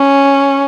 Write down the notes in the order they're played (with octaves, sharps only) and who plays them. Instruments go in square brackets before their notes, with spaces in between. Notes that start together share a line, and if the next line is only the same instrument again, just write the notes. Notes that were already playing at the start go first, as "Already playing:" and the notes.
Already playing: [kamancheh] C#4